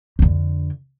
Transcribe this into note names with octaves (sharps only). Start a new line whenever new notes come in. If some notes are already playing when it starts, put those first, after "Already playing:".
F2 D3